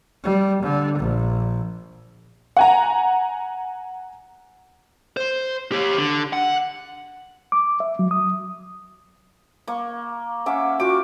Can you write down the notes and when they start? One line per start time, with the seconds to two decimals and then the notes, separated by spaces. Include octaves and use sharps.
0.24 G3
0.62 D3
0.98 A#1
2.57 F#5 G#5 A#5
5.17 C5
5.72 G4 C#5
5.98 D3
6.33 F#5
7.52 D6
7.80 E5
7.99 F#3
8.11 D#6
9.67 A#3 C#6
10.46 C#4 E5 F#5 D6
10.80 F4 F#4 G5 D6